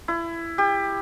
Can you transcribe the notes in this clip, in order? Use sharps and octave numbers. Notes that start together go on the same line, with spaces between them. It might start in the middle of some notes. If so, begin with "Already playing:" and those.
E4
G4